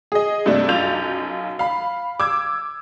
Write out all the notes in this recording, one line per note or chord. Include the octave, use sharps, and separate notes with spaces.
G#4 D#5
G2 C3 A3 D4
B1 F#2 F4 G6 A6 F7
F5 B5
D6 E6 G#6